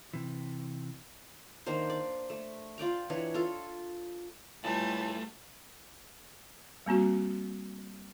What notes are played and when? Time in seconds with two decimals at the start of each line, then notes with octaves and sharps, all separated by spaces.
0.14 C3 E3
1.66 D#3 A#3 D4 C5
1.90 D5
2.30 A3
2.78 F4 D5 G5 A#5
3.10 E3 D4 C#5
3.34 F4 A4
4.64 C#2 A2 G3 A3 F4 B4 G#5 A5
6.86 G3 A#3 C4 F#4